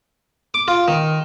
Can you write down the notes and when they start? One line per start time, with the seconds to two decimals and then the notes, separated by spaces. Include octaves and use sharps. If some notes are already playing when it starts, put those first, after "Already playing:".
0.54 D6
0.68 F4
0.88 D#3